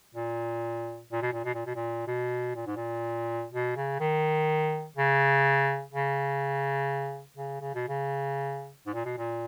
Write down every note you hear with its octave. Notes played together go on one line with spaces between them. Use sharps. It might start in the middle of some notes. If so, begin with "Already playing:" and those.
A#2
A#2
B2
A#2
B2
A#2
B2
A#2
B2
A#2
G#2
A#2
B2
C#3
D#3
C#3
C#3
C#3
C#3
B2
C#3
G#2
A#2
B2
A#2